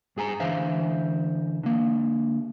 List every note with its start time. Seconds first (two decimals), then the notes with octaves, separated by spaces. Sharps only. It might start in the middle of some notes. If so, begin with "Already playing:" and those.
0.17 G2 G#4 G#5 A#5
0.40 D2 D3 E3 C5 E5 F5
1.63 D3 A#3